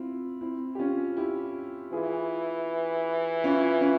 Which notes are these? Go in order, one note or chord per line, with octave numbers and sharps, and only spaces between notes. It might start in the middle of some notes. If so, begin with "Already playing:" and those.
Already playing: C4 E4 F4
C4 E4
G4
C#4 F4
E4 G4
E3 F4 G#4
C#4 F4
C#4 F4